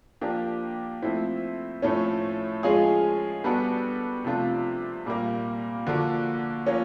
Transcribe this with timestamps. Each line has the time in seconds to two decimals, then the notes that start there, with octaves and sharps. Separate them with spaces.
0.21 F3 A#3 D4 G4
1.02 F3 A3 C4 E4
1.82 A2 F3 A3 C#4
2.63 F3 G#3 C#4 F4 G#4
3.44 G3 B3 D4 F#4 A4
4.24 C3 F3 A3 D4 F4
5.06 A#2 G3 A#3
5.87 D3 F3 A#3 D4 F#4
6.66 F3 A#3 C#4